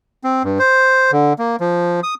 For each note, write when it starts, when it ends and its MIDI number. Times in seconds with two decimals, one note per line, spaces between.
0.24 0.43 60
0.44 0.58 43
0.59 1.11 72
1.12 1.33 50
1.39 1.56 58
1.60 2.00 53
2.03 2.14 87